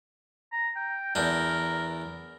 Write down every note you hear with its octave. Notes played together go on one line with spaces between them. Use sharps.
A#5
G5
E2 D4 A#4